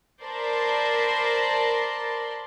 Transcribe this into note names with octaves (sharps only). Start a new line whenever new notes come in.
A#4 C5 D5 A5 B5 C6